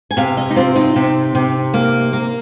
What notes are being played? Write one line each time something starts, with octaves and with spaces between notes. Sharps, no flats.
G#5
C3 F5
D#5
D#4
C4 F4
D#4
C3
C3
A#3
A#3